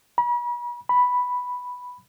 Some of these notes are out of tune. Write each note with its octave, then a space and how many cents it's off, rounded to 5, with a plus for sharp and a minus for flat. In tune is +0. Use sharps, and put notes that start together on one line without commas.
B5 -40
B5 +0